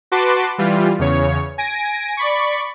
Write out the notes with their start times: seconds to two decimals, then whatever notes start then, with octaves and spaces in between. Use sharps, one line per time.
0.12 F#4 B4 A5 C6 D6
0.58 E3 G3 F4
0.99 E2 C#3 C#5
1.58 G#5 A#6 D7
2.17 D5 B5 C#6